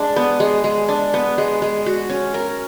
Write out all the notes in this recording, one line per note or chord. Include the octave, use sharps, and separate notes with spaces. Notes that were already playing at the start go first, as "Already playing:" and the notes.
Already playing: G#3 D4
B3
G#3
G#3
D4
B3
G#3
G#3
F#4
C#4
A#4